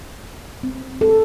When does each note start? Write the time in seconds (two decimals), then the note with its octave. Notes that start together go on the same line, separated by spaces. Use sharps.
0.63 C4
1.01 A4